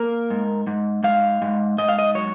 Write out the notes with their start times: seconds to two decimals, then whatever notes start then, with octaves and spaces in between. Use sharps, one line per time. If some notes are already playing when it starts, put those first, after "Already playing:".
Already playing: A#3 A#4
0.30 G#2
0.67 G#2
1.04 G#2 F5
1.42 G#2
1.78 G#2 D#5
1.89 F5
1.99 D#5
2.15 F#3 C#5